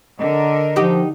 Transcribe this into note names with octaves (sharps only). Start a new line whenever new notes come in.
D3 A#4 D#5
F3 D#4 F#4 G4